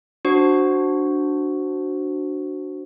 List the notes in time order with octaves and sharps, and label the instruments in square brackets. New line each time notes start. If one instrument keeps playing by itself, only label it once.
[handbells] D4 F#4 C5